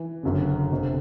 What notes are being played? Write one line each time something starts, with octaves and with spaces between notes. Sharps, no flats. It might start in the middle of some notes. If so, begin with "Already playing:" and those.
Already playing: E3
G1 F#2 C#3
G1 F2 C3